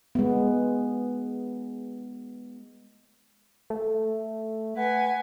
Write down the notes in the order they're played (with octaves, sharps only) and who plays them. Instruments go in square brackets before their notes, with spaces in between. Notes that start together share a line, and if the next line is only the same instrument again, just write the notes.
[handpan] G#3 B3
[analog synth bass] A3
[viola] B4 G#5 [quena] F#5